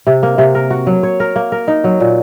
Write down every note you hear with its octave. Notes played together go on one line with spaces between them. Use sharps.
C3
A#3
C3
A#4
F#4
F#3
C#5
A#4
A#3
A#4
D#4
F#3
A#2